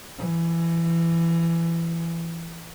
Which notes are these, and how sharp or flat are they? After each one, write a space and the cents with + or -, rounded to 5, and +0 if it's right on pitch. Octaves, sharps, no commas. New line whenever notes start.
E3 +20